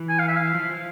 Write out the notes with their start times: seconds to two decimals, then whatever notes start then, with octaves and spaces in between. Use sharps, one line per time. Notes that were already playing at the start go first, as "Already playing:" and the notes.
Already playing: E3
0.09 G#5
0.19 F5
0.28 E5
0.37 F5
0.55 F3
0.71 F3